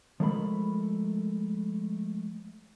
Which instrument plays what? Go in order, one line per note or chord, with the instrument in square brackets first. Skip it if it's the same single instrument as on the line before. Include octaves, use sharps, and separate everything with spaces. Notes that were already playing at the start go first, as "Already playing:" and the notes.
[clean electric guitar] F3 G#3 A3 A#4 E5 B5